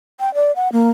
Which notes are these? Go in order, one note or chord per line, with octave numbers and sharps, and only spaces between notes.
G5
D5
F#5
A#3